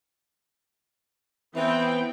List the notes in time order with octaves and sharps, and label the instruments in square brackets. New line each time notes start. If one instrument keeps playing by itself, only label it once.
[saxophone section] E3 [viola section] B3 C4 G5